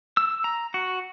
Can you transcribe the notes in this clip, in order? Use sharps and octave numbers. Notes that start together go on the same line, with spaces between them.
E6
A#5
F#4